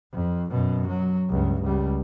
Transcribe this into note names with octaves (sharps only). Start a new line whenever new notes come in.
F2
F#2 B2
F#3
C#2 G2
C#2 G3